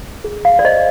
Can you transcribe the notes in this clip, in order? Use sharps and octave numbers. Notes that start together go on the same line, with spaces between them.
G#4
F5
D5
C5 D#5